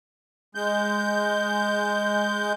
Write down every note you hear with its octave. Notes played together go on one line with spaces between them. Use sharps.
G#3 G6